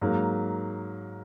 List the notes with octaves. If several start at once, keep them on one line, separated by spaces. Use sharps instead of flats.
G#2 F#3 A#3